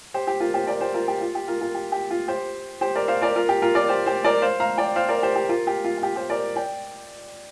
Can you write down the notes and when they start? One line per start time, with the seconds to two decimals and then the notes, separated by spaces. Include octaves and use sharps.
0.14 G4 C5
0.27 G4
0.40 F4 A#4
0.54 G4 C5
0.67 A#4 D5
0.81 G4 C5
0.94 F4 A#4
1.08 G4
1.21 F4
1.35 G4
1.48 F4 A#4
1.61 F4 A#4
1.74 G4
1.92 G4
2.11 F4
2.28 G4 C5
2.81 G4 C5
2.96 A#4 D5
3.08 C5 F5
3.22 A#4 D5
3.35 F4 A#4
3.49 G4
3.62 F4 A#4
3.75 A#4 D5
3.89 G4 C5
4.06 G4 C5
4.25 A#4 D5
4.42 C5 F5
4.60 F5 A#5
4.78 D5 G5
4.96 C5 F5
5.09 A#4 D5
5.23 G4 C5
5.35 G4
5.49 F4 A#4
5.67 G4
5.84 F4
5.98 F4
6.03 G4
6.16 G4 C5
6.30 A#4 D5
6.56 D5 G5